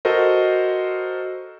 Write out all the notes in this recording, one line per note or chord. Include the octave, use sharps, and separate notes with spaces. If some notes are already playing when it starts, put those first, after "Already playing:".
F#4 A4 A#4 C5 D#5